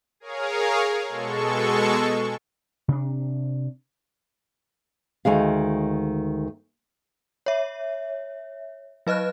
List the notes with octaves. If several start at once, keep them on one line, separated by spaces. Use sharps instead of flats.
G#4 A#4 C#5 F5
B2 G#3 A4 C#6
C3 D4
D2 D#3 G#3 F5
C#5 E5
F#3 B4 D#5 F6 F#6